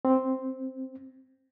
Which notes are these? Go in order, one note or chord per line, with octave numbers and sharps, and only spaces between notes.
C4